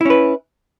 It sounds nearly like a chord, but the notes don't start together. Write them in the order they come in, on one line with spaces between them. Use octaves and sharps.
E4 C#4 B4